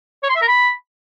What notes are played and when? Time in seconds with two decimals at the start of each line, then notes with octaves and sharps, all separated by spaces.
0.23 C#5
0.29 C6
0.35 E5
0.42 A#4
0.48 B5